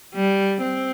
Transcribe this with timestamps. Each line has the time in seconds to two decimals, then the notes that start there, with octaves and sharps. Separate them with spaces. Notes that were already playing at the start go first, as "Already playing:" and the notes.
0.14 G3
0.62 C4